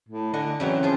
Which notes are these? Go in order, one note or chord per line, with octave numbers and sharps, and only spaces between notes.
A2
D3 D#5 F#5 G#5
C#3 E3 F#3 C4
F3 F4 G#4